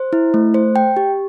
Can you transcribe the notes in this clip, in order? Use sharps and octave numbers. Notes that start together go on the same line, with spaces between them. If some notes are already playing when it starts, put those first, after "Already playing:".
Already playing: C5
E4
A3
C5
G5
G4